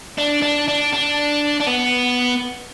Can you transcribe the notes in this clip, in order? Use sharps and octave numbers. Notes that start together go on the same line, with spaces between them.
D4
D4
D4
D4
D4
B3